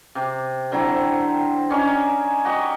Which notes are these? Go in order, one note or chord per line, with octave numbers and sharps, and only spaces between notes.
C3
D3 F#3 C4 E4
C#4 D#4 C#5 D5
F#4 G4 D#5